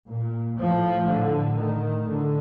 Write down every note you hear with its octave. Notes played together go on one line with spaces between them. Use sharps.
A#2
A2 F3
A2 D3
A2 D#3
A2 D3